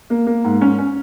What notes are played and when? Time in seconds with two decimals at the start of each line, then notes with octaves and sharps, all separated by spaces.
0.10 A#3
0.27 A#3
0.44 G#2
0.61 C#4
0.78 C#4